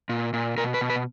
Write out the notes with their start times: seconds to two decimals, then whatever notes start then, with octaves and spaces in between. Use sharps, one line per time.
0.09 A#2
0.33 A#2
0.57 B2 A#4
0.74 B4
0.81 B2
0.90 B4